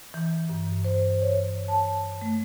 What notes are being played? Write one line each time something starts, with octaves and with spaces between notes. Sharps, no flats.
E3
G2
C5
C#5
A5
A3